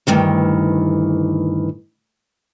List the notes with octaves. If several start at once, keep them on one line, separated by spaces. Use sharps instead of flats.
D2 G2 D#3 E3